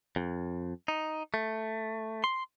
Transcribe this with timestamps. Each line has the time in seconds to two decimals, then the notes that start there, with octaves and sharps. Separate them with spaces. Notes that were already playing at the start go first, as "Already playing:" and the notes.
0.16 F2
0.88 D#4
1.34 A3
2.24 C6